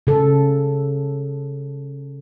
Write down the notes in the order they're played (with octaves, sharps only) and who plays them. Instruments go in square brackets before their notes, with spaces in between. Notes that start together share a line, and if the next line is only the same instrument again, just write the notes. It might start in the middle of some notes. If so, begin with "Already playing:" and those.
[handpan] C#3 A4